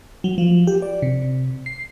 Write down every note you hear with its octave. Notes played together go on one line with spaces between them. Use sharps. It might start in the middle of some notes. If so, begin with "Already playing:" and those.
F#3
F3
G4
D5
C3
C7